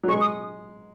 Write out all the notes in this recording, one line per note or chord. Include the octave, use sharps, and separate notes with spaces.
F#3
G#3 C#6
D#6